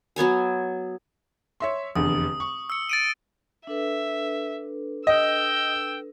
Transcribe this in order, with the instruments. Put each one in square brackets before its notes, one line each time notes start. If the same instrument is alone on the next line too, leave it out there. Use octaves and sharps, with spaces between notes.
[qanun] F#3 B3 C#5 G#5
[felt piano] C#5 E5 C6
[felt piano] F1 E2 D3 [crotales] D#6
[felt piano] C#6
[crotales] E6 C#7
A6 D7 D#7
[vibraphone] D4 A4 B4 [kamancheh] E5
[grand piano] D#5 [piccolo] G5 [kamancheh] E6